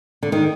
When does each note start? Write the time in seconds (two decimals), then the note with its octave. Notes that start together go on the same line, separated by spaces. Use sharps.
0.23 D3
0.32 D#3